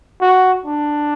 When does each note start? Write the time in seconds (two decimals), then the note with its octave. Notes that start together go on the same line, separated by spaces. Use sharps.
0.21 F#4
0.66 D4